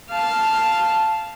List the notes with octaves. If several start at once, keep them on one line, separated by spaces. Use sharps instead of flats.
F5 A5